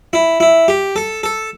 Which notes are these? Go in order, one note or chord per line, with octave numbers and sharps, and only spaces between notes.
E4
E4
G4
A4
A4